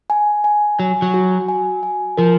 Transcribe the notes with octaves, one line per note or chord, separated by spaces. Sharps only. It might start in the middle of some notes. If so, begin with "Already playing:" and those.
G#5
G#5
F#3 G#5
F#3
F#4
G#5
G#5
F3 A#4